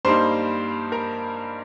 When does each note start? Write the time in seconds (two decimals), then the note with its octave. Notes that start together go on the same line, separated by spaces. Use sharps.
0.05 G2 G3 A#3 D#4 C5 C6
0.92 A#4 A#5